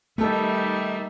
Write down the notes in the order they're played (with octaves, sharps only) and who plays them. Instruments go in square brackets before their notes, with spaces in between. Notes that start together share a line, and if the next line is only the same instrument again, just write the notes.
[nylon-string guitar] D#3 B3 A4 [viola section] G3 D#4 E5 [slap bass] A3